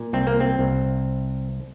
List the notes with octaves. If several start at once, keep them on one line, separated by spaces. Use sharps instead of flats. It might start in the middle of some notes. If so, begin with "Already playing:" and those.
Already playing: A#2
C2 C4
A#3
C4
C2